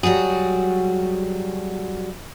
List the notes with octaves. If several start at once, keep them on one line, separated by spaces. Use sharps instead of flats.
F#3 G3 F#4 G#4